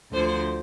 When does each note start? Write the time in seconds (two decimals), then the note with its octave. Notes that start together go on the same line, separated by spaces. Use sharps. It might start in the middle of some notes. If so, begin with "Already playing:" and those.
0.12 D2 D3 F3 C5